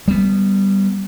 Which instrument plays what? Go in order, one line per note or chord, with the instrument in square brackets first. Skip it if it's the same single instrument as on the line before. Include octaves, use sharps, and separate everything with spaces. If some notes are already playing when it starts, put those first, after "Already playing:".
[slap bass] G3 B3